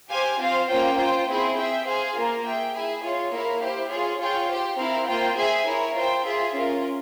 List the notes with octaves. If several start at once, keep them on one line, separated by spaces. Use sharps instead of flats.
G4 C5 F5 G#5
C4 F4 C5 F5
A#3 C#4 F4 C5 G5
F4 C5 G5
C4 E4 G#4 C5
G#4 E5 G5
G#4 C5 F5 G#5
A#3 F4 A#4
G#4 E5 G5
E4 G#4 E5 G#5
F4 G#4 C#5
A#3 E4 A#4 C#5 F5
E4 G4 C5
F4 G#4 C#5
F4 G#4 C#5 G5
G4 C5 G5
C4 E4 A#4 F5
A#3 F4 C5 G5
G#4 C5 E5 G#5
E4 A#4 C#5
F4 C5 G5
F4 G#4 E5
C#4 F4 A#4